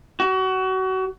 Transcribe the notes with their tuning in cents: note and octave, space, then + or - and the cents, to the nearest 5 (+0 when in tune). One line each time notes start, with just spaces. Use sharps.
F#4 +30